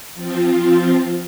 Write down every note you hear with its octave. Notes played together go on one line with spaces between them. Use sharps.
F3 C4 F4